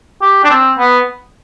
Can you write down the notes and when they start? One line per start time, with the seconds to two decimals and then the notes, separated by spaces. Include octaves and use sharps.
0.22 G4
0.44 D4
0.50 C4
0.79 B3